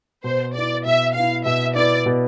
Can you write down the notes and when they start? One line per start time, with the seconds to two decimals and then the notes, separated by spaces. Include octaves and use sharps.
0.24 B2 C5
0.54 B3 E4 D5
0.85 B2 E5
1.15 B3 E4 F5
1.45 B2 E5
1.76 B3 E4 D5
2.06 B2